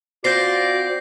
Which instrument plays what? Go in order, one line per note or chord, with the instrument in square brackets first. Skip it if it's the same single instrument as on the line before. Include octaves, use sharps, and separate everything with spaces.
[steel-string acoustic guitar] C4 F4 C5 [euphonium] F#4 [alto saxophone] D5 [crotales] G6 A#6 C7